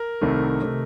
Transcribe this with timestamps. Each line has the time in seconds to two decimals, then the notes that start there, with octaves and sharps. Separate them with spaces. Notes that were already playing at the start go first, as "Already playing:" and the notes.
Already playing: A#4
0.21 C2 C3 D#3 A3
0.62 C3 D#3 A3